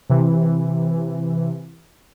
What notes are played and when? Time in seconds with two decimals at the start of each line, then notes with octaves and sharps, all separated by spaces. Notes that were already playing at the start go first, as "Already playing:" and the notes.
0.10 C3 E3